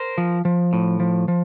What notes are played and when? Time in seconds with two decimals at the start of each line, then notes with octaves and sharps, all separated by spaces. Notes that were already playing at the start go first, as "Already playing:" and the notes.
Already playing: A#4 C5
0.18 F3
0.45 F3
0.73 A2
1.00 F3
1.28 F3